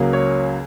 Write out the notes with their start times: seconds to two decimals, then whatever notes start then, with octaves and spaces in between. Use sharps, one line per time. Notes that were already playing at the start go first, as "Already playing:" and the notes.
Already playing: C#2 C#3 F#3 A#3
0.13 C#5